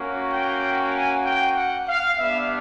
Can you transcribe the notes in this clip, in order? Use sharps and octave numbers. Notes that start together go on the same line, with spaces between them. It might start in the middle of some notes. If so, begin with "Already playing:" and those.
Already playing: A#3 C#4 F#4
G5
G#5
G5
F#5
F5
G3 B3 D4 E5